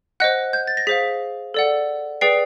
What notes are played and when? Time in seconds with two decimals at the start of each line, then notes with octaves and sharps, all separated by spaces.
0.20 C5 D#5 F#5 F#6
0.53 G6
0.67 A6
0.77 A#6
0.87 G#4 C5 F5 B6
1.54 A4 D5 F#5
2.21 G#4 B4 D5 G5 C7